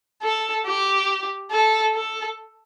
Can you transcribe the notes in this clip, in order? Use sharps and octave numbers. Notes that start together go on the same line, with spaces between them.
A4
G4
A4
A4